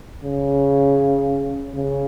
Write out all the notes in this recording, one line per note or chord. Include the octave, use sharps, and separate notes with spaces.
C#3
C#3